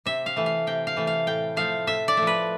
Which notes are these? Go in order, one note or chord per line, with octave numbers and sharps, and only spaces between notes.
C3 E5
F5
E3 A3
F5
C3 G5
F5
E3 A3
F5
A2 G5
F3 A3 F5
A2 E5
D5
F3 A3
B4